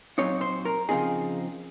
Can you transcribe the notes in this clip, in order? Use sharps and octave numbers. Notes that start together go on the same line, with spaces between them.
A#2 F#3 C4 D#4 C#5
C5
A#4
C#3 F3 C4 D#4 G#4